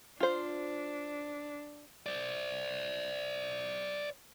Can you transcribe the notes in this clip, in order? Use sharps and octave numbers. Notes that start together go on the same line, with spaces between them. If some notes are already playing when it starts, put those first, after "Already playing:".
D4 F4 C5
C5 D5